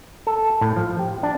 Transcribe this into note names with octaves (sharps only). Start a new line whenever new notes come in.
A4
A2
F3
G4
D4